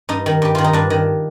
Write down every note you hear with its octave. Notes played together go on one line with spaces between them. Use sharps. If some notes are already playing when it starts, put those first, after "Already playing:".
G2 D#4
D#3
G2 G4
D#3 F4
D#4
G2 D4
D#3